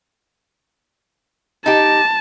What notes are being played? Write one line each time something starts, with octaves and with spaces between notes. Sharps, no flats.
D#4 G4 A5